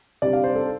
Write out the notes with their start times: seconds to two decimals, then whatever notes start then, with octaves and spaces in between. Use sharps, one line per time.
0.22 C3 G3 D4 D5
0.33 F5
0.44 C5
0.55 A4